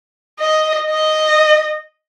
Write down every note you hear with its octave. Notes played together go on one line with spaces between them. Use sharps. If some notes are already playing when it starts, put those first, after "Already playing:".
D#5
D#5